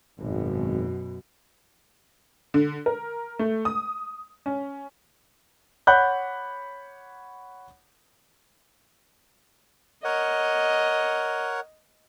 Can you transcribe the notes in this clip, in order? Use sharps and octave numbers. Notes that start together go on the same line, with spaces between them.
G#1 F#2 B2
D3
A#4
A3
D#6
C#4
C#5 F#5 B5 F#6 G6
A#4 C#5 D#5 F#5